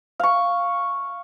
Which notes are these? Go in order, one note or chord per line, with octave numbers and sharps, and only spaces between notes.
F5 C#6